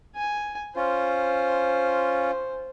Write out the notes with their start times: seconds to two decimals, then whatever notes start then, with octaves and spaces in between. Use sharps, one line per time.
0.15 G#5
0.76 C#4 F4 C5